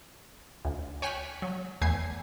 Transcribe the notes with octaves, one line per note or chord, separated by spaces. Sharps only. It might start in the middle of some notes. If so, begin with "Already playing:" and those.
D2
C#5 G5 G#5 F6 F#6 B6
F#3
E2 A3 G#4 G#6 C7